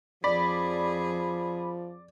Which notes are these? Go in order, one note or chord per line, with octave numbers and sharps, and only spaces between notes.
F2 F3 G#4 D5 B5